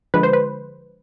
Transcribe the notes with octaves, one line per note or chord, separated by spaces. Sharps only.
D3 F3 G#3 B4
C5
B4